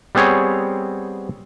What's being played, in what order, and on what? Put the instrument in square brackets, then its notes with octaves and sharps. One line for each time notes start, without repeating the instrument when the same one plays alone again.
[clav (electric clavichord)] G3 B3 C4 G#4 C#5